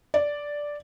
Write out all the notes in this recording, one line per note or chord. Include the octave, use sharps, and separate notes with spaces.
D5